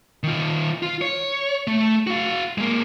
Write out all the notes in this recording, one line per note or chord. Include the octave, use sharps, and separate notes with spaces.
D#3 F4
F4
C#5
A3
F#4 F5
G#3 A#3